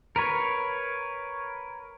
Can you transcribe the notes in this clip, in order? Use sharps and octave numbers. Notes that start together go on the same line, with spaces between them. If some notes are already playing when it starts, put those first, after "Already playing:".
A#4 B4 C#5